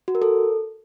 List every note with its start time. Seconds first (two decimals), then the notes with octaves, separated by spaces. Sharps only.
0.08 F#4
0.15 A#4
0.22 A4